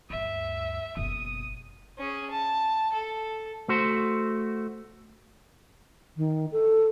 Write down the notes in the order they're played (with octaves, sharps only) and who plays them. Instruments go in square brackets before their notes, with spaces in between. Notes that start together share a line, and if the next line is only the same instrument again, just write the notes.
[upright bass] D2 G2 [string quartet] E5
[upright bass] F#1 B2 [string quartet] D#6
[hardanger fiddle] C#4 G#4
A5
A4
[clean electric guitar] A3 F#4 C5
[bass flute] D#3
A4